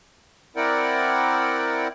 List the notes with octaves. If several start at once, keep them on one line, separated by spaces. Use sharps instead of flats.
C4 E4 A#4 D5 F#5 G5